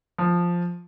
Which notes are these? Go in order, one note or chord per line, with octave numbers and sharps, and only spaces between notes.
F3